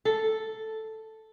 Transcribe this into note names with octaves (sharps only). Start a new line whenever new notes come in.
A4